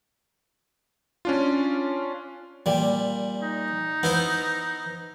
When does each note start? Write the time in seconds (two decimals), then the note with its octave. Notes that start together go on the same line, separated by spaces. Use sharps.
1.25 C#4 D4 F4
2.66 A#2 G3
3.42 D#4
4.03 B3 E4 C5